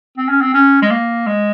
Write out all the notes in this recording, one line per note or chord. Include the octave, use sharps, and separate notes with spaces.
C4
C#4
C4
C#4
G#3
A#3
G#3